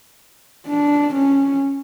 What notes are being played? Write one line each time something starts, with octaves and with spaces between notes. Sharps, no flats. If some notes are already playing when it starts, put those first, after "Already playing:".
D4
C#4